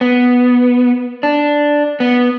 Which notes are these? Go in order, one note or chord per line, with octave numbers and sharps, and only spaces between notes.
B3
D4
B3